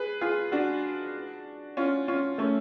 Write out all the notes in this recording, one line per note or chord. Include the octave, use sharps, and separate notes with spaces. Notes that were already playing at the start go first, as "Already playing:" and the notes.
Already playing: G#4 B4
F4 G#4
D4 F#4
C#4 F4
C#4 F4
A3 C#4